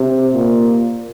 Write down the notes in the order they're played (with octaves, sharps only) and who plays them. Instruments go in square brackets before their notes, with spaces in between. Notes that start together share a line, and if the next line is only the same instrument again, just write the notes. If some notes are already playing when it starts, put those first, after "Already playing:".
Already playing: [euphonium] C3
A#2